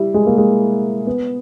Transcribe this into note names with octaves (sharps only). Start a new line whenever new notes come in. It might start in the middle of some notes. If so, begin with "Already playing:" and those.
Already playing: G3 E4
G#3
A#3
G#3
B3